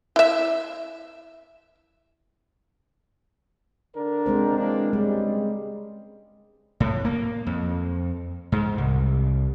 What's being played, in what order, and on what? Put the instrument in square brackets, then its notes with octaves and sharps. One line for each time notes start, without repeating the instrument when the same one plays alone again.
[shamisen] E4 E5
[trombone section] D3 D4 A#4
[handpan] G#3 C4 C5
[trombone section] E3 A#3 D4
[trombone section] G2 C#3 G3 [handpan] G#3
[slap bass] A2
A#3
F2
G#2
C2